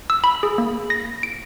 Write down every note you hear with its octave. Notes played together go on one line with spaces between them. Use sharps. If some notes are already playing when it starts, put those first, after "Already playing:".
E6
B5
G#4
A#3
A#6
D7